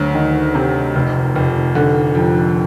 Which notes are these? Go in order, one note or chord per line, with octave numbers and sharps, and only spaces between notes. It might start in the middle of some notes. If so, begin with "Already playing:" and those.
Already playing: D2 F#3
D#3
C3
F1
F1
D3
F2